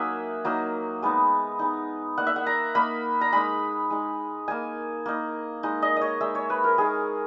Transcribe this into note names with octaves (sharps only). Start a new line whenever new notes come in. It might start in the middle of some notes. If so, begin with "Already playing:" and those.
Already playing: F#3 A#3 D#4 E5 F#5 G#5
F#3 A#3 D#4
G#3 B3 D#4
G#3 B3 D#4
A#3 D#4 F#5
E5
F#5
A#5
A#3 D#4 B5
A#5
G#3 D#4 B5
G#3 D#4
A#3 D#4 G#5
A#3 D#4
G#3 D#4
D#5
D#5
C#5
G#3 D#4 E5
C#5
B4
A#4
G#3 D#4 G#4